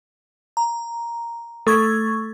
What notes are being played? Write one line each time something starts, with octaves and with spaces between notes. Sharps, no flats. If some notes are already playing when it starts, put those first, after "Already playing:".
A#5
A3 A4 C#6 G#6